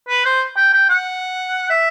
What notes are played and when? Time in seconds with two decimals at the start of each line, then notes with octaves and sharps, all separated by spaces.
0.09 B4
0.25 C5
0.57 G5
0.73 G5
0.89 F#5
1.70 E5